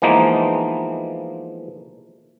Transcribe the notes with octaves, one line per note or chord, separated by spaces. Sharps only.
E3 F3 G#3 A#3 B3 D#4